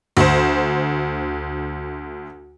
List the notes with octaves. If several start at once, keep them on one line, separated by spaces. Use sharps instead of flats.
D2 C5